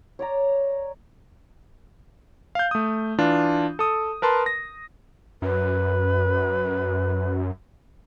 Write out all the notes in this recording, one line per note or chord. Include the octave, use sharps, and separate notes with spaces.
C#5 D5 A#5
F5 G6
A3 D#6
E3 D4 F4
A4 D#6
A#4 B4 A5 C6
A#6
F#2 B4